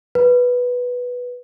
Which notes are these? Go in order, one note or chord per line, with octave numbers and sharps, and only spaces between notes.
B4